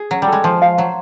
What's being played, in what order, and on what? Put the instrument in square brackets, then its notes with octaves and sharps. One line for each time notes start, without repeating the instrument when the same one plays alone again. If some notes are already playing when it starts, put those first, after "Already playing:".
Already playing: [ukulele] G#4
[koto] F#3 [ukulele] C#4
[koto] G3
[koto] G#3 [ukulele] A4
[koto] F3 [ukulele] C5
[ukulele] F5
[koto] F#3 [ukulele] C5